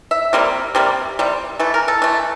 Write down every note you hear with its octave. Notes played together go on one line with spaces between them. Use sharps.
E5
C3 G3 A#3
C3 G3 A#3
C3 G3
E3 A3
A#4
A4
E3 A3